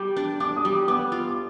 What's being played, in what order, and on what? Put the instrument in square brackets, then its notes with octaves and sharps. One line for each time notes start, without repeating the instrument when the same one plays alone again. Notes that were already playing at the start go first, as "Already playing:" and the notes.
Already playing: [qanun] G3 [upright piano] D6
[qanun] D4
[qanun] D4 [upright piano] D6
[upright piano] D#6
[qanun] G3
[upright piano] D6
[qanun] B3 [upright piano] D6
[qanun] F4
[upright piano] D6